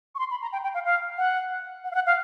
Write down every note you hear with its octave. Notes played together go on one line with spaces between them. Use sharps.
C#6
C6
B5
A#5
G5
G5
F5
F5
F#5
F#5
F5
F#5
F5